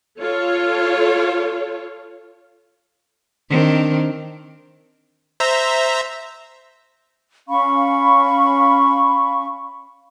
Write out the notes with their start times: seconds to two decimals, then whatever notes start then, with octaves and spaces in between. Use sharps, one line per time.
0.19 F4 A4 C#5
3.49 D#3 C4 D4
5.40 C5 E5 A#5
7.48 C#4 F5 B5 C#6